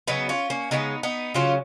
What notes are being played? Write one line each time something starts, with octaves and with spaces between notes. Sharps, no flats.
C#3 F#3 B3 D#4
C#4 F4
A#3 C#4
C#3 F3 G#3 B3 D#4
B3 D#4
C#3 F#3 C#4 F4